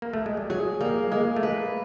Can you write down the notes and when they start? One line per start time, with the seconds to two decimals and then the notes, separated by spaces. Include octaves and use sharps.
0.02 A#3
0.13 A3
0.26 G#3
0.37 G3
0.50 F#3 G#4
0.81 G3 A#3
1.12 G#3 A#3
1.36 A3
1.43 G#3 B4